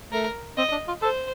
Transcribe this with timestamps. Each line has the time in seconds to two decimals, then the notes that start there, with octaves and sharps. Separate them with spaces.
0.12 A3 A#4
0.57 C4 D#5
0.72 D4
0.88 F4
1.02 A4 C5